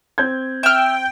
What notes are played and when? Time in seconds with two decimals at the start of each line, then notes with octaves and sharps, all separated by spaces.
0.18 C4 G6 G#6
0.63 E5 G5 F6